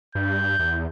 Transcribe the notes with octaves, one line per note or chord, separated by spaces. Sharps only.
G2 G6
E2